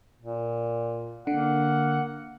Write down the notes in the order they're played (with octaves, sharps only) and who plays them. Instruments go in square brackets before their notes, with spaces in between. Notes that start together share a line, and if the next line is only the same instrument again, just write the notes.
[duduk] A#2
[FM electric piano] D3 [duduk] A#3 [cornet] F#5